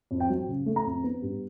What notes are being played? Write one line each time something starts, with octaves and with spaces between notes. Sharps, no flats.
F2
G5
F#3
C#3
A3
A#5
F2
B3
G2